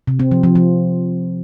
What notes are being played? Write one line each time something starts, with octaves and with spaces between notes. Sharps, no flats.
C3
C4
F3
F3
F3